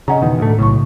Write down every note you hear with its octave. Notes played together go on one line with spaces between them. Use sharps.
C#3 C#4 D#5 F#5 A#5
E2 B2 D#3
D2 A2 A3
B1 A2 C#3 C#6